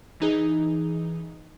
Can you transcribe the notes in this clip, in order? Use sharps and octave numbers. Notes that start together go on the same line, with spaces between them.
E3 D#4 G#4